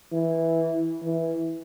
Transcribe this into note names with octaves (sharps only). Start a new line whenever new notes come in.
E3
E3